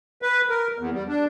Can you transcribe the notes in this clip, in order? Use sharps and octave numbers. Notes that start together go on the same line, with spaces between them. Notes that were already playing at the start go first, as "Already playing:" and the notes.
B4
A#4
E2
G3
D4